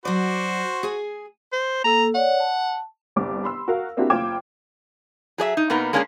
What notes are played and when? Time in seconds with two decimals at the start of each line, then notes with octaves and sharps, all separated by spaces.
0.05 F#3 F#4 C5 D5
0.83 G#4 G#5
1.52 C5
1.84 A#3 A4 A#5 E6
2.15 C#5 D5 F#5
2.40 A5
3.16 G1 C2 D6
3.44 B5 C6 E6
3.68 F#4 A#4 F5
3.97 A#3 C4 D4 E4 F#4 G4
4.10 F#1 F4 G5 D6 G#6 E7
5.38 F#3 G#4 D5 E5
5.57 D#4
5.70 B2 A#3 B3 D#4
5.93 G#3 A#3 C#4 D4 F#4 G#4